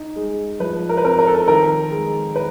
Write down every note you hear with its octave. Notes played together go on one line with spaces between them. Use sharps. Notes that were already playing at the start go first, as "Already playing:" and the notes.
Already playing: D#4
G#3
F3 B4
A#4
B4
C4 A#4
A#4
A4
A#4
D#3 A#4
G#3
B4